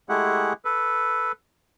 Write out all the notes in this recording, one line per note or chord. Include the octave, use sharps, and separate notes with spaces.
G#3 A3 E4 G4 G#4 F#5
A4 B4